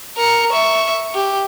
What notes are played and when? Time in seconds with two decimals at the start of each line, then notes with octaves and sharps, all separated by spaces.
0.17 A#4 C#7
0.50 E5 C#6
1.14 G4